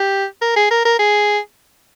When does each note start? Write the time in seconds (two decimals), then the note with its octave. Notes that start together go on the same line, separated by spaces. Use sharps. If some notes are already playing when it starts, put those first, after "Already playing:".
Already playing: G4
0.42 A#4
0.56 G#4
0.71 A#4
0.85 A#4
0.99 G#4